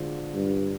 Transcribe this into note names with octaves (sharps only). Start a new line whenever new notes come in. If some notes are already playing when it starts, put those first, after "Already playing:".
Already playing: D3 G#3 D4 F4 C5
G2